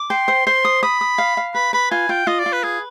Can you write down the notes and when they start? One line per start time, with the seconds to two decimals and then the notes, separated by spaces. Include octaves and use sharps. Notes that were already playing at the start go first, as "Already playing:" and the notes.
Already playing: D6
0.10 G5 C6
0.28 C5
0.46 C5 C6
0.65 D#6
0.83 B5 D#6
1.01 D#6
1.18 F5
1.37 F5
1.54 B4 B5
1.73 B4 B5
1.91 F4 G#5
2.09 F4 G5
2.27 F4 D#5
2.39 D5
2.46 F4
2.52 B4
2.63 G#4 B4